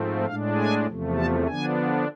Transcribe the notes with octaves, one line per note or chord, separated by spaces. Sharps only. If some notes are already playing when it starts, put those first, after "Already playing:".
Already playing: G#2 F3 A3 C4
A2 G#3 D4 F5
G#5
E2 C3 F3 A3
A5
D3 F3 B3 D4 G#5